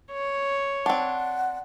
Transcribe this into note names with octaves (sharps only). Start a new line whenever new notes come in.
C#5
C4 D4 F#5